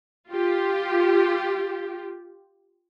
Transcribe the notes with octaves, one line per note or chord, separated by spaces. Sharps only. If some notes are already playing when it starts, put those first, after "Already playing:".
F4 G4